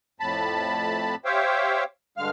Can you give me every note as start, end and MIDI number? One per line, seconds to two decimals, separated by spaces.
0.20 1.15 41
0.20 1.15 45
0.20 1.15 81
0.20 1.15 83
1.25 1.84 67
1.25 1.84 72
1.25 1.84 73
1.25 1.84 76
1.25 1.84 77
1.25 1.84 79
2.18 2.30 43
2.18 2.30 50
2.18 2.30 56
2.18 2.30 77
2.18 2.30 89